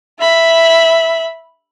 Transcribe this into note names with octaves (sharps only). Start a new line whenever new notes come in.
E5 B5